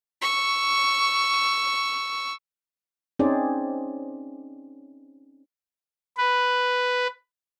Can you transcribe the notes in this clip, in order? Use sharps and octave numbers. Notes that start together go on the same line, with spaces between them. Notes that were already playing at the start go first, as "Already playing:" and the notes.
C#6 E6
C4 C#4 D#4 G#4 C5 D5
B4